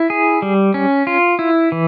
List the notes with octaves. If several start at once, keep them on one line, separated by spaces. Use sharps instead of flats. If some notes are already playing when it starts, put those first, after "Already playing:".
Already playing: E4
G#4
G3
C#4
F4
E4
E3